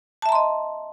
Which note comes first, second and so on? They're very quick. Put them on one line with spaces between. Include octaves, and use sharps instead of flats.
A5 E5 A#5 C6 D#5